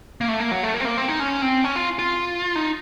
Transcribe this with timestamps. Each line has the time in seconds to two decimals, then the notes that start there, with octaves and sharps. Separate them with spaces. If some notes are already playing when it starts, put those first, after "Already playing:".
0.21 A#3
0.28 A3
0.40 A#3
0.51 F#3
0.63 A3
0.74 A#3
0.81 C4
0.85 A#3
0.97 C4
1.08 D#4
1.20 C#4
1.42 C4
1.64 C#4
1.76 F4
1.99 F4
2.56 D#4